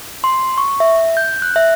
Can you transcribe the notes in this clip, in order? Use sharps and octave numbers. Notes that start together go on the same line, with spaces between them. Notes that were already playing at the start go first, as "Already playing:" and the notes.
C6
C#6
E5
G6
F#6
E5